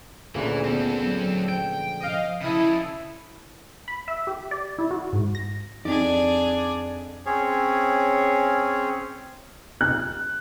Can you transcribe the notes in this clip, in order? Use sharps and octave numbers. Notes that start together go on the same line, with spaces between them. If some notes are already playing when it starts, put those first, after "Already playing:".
D2 A#2 C#3 E3
B3 C4 A4
F#3
F3 G5
D#5 F5
C#3 E4 A4 D#6
B5
E5
G4
D5
E4
F#4
G#2
A#6
F2 D4 D#4 G#4 D5
C4 C#4 G#4 C#5
F#6